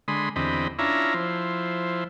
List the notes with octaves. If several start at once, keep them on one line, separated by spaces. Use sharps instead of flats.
D3 G#3 B5 C6 D#6
E2 D3 C4 G4 D#5 B5
C#4 D4 E4 F4 E5 A#5
F3 E4 C5